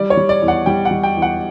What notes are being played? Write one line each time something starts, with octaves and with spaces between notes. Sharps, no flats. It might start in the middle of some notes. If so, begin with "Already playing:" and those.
Already playing: G3 D5
C#5
G3
D5
E2
F#5
G3 G5
F#5
G3
G5
E2
F#5